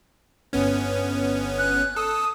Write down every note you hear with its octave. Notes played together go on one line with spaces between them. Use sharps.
G1 B3 C#4
F#6
A4 D#6